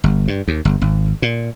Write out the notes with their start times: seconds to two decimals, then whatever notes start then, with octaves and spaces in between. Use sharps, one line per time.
0.04 G1
0.28 G2
0.48 D#2
0.65 G1
0.82 G#1
1.22 A#2